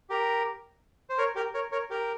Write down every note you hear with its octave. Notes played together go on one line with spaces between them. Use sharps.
G4 A#4
C5
A#4 C#5
G4 A#4
A#4 C#5
A#4 C#5
G4 A#4